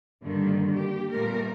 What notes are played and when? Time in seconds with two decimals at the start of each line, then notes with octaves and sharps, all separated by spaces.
0.23 G2 D3 D#3 G3 A#3
0.74 A#3 G4
1.12 A#2 G3 A3 B3 A#4